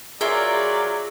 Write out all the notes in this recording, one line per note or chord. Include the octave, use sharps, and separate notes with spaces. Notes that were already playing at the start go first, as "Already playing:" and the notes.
F#3 F4 G#4 A#4 D5 E5